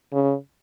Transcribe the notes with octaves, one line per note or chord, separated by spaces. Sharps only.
C#3